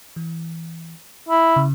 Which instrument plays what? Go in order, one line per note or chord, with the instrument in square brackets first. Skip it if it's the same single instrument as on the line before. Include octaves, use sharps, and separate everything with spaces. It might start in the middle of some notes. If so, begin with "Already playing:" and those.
[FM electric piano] E3
[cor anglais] E4
[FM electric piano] C#3